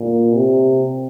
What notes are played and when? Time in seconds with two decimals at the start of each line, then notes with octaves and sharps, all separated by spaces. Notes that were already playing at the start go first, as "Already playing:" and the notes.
Already playing: A#2
0.33 C3